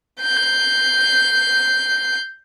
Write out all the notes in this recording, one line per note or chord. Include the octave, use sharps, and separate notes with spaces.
G6 C7